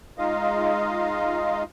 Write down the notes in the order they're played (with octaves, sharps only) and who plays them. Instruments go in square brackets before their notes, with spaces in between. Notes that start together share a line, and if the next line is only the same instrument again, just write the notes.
[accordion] G#3 D#4 F4 D#5 F5